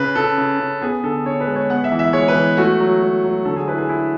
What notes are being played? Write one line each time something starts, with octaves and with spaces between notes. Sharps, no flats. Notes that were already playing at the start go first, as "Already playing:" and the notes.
Already playing: C#3 B4
C#3 A4
C#3
C#3
B3 G#4
D3 A4
D3 C#5
B4
G#3
C#5
B3 F#5
E5
E3
E5
G#3 C#5
B4
E3
A3 F#4
F#3
F#3
F#3
D3 A4
G#4
E4 B4
G#4
E4 G#4